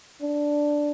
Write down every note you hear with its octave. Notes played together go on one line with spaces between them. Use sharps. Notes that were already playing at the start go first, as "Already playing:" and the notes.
D4